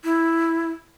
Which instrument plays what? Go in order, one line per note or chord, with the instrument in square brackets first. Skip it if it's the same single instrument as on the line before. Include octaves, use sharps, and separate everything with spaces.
[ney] E4